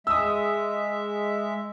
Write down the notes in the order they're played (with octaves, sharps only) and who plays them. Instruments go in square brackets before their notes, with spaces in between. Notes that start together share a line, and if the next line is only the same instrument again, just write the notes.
[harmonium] G#3 E5 [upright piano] D#6 E6